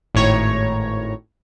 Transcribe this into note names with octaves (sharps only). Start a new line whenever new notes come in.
G#1 A2 C#5 A#5